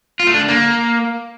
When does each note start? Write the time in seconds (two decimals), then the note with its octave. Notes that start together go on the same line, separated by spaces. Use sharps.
0.20 F4
0.27 A3
0.34 D4
0.41 D3
0.48 A#3